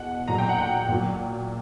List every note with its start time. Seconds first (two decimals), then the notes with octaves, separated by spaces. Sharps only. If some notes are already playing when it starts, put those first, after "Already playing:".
Already playing: E2 B2 F#5
0.28 A#2 F#3 A#5
0.38 G5
0.49 F#5
0.58 G5
0.89 A#2 F#3